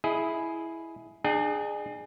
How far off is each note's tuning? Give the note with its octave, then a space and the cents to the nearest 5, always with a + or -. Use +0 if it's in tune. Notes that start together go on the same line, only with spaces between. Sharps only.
E4 +0 G#4 +15 D#5 +0
D4 +40 G#4 +0 G5 -15